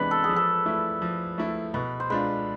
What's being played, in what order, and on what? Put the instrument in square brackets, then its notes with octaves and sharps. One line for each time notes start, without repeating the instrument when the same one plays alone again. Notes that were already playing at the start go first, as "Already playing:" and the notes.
Already playing: [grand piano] C3 E3 G#3 B3 D4 [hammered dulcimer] B4 D5
[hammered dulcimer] A4
G#4
[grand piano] F3
[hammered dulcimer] A4
[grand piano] A3 E4
F3
A3 E4
[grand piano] B2 [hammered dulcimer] B4
[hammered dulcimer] C5
[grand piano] G#3 D4 F4 [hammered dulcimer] B4